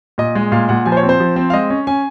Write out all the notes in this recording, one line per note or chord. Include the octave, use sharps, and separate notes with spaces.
A#2 D#5
G#3
A#2 F5
A#2 F#5
F3 G#5
C5
C#5
C4
C5
F3
C4
F5
G#3 D#5
C#4
C#4 G#5